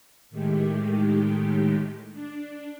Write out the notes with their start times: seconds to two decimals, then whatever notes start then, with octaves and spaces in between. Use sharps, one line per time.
0.30 A2 D#3 G#3 A3 G4
2.13 D4